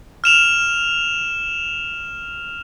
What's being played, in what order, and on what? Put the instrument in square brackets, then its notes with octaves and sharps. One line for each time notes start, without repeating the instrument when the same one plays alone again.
[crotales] F6 E7 F7